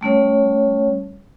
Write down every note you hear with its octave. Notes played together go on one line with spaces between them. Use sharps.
G3 A3 C#4 C#5